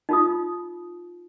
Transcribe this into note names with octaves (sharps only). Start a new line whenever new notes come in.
D#4 F4 D#6